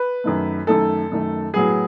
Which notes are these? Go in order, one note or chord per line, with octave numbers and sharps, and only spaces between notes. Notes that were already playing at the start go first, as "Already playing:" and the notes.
Already playing: B4
F#2 D#3 A3
F#2 D#3 A3 A4
F#2 D#3 A3
A2 F#3 B3 G#4